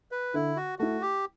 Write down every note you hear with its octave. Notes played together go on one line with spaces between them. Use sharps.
B4
D3 E4
F#4
A3 E4 F#4
G4